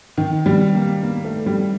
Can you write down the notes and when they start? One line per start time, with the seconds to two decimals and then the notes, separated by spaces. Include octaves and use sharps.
0.17 D#3
0.46 G3
0.75 A#3
1.03 A#3
1.24 A3
1.46 G3